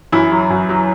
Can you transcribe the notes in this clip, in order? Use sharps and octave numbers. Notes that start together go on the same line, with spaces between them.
F#2 E3 E4
F#3
F#2
F#3